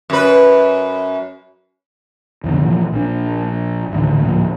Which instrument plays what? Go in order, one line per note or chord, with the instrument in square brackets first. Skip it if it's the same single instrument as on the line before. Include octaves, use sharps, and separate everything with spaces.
[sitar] F#2 B4
[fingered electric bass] C2 F2 B2 D3
A#2 E3 F3
A#1 D4
D#1 A1 D2 D3
D1 A#2 F3